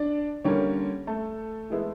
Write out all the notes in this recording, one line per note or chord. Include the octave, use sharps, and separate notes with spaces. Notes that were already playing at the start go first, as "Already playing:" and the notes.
Already playing: D4 D5
D3 G3 A#3 C#4 C#5
A3 A4
E3 G#3 B3 E4